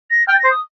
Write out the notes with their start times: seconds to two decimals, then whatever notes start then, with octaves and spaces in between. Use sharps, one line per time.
0.11 A#6
0.28 G5 F6
0.34 A6
0.39 A#6
0.44 C5
0.50 D#6